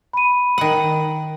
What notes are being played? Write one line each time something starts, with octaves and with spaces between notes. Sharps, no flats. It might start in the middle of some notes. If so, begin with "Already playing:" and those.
B5 D#7
D#3 F#5